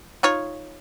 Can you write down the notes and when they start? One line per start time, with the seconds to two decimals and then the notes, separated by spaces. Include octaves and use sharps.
0.23 D#4 F4 C#5